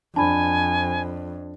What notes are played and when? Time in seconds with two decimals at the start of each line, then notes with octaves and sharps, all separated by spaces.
0.16 F2 D4 G#5 A5 B5